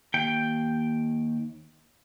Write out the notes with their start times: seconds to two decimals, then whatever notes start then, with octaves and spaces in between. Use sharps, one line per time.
0.14 D#2 G5